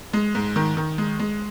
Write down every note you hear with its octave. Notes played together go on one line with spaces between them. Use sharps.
G#3
G#2
D#3
D#3
G#3
G#3